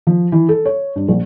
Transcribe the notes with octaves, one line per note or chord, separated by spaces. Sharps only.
F3
E3
A4
C#5
G2
A#1